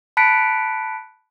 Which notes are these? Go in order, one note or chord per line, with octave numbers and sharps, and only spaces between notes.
A5 B5 F#6 B6 C#7 D7